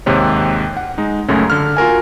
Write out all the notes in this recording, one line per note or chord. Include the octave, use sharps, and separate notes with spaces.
D#2 G#2 C3 C#5
F#5
G#3 D#4
C#2 F#2 G#3 A3 C#4
D3 F6
F4 F#4 A#4 G#5